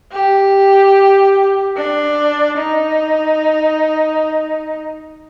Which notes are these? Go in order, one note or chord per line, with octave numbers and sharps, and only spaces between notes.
G4
D4
D#4